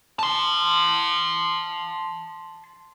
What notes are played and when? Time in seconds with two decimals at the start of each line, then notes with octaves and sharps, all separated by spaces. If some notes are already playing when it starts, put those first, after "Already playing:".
0.19 A5 C6